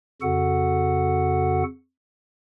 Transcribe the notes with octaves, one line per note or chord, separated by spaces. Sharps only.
F2 C#3 F#4 A4 F#5